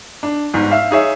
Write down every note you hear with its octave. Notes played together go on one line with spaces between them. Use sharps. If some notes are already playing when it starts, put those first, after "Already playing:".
D4
G1 G#2
E5 F5
D#4 G#4 C#5 E5